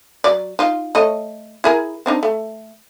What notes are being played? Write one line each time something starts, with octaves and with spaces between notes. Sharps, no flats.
F#3 D5
D#4 F4
A3 C#5 D#5
E4 G#4 A#4
C4 D4 D#4
A3